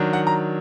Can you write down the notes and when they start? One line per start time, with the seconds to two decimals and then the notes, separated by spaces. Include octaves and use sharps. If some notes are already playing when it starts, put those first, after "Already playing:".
Already playing: D#3 F#3 D4
0.13 F#5
0.27 A#5